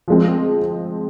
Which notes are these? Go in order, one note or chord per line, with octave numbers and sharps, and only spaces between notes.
F3 G#3 C4